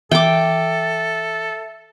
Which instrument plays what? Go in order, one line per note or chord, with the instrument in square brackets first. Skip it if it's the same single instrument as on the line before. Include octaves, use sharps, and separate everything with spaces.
[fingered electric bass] E3 [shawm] A4 [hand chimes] E5 [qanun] G5 D6